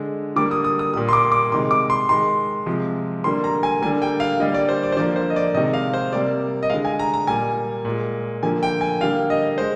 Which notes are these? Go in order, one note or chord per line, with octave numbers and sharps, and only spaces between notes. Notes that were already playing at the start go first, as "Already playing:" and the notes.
Already playing: D3 G#3
D3 G3 A#3 D6
D#6
D#6
D#6
A#2 G3 A#3 D#6
C6
D6
D6
C3 D#3 G#3 C6
D6
C6
D#3 G#3 C6
C3 F3 G#3
D3 G3 A#3 C6
A#5
G#5
D3 G3 A#3 G#5
G5
F5
D3 G3 A#3 D#5
D5
C5
D5
C5
D3 F3 A#3 D5
C5
D#5
D5
C3 D#3 G#3 D#5
F5
C5
C3 G3 A#3 D5
D#5
D3 G#3 F5
G#5
A#5
A#5
A#2 G3 A#3 G#5
A#2 G#3
D3 F3 A#3 G#5
G5
G#5
D3 G3 A#3 F5
D#5
G#3 C5